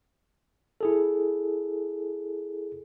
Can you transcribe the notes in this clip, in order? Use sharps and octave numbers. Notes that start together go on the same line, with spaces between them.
E4 G#4 A4